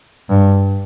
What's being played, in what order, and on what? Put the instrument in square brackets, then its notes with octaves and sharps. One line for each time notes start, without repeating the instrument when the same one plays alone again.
[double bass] G2